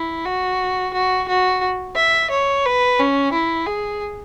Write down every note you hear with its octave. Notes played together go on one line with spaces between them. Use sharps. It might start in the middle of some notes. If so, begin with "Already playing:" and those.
Already playing: E4
F#4
F#4
F#4
E5
C#5
B4
C#4
E4
G#4